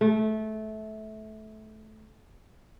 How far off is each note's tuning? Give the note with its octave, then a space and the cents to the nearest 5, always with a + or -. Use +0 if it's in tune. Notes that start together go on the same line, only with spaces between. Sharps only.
A3 -20